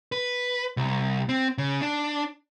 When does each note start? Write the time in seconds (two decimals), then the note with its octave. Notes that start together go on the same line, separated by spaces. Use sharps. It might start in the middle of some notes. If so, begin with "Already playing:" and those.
0.12 B4
0.77 C2
1.29 C4
1.58 C#3
1.81 D4